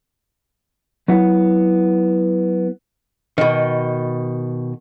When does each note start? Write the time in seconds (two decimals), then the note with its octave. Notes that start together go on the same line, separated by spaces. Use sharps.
1.08 F#3 B3 E4 F#5
3.38 B2 D#3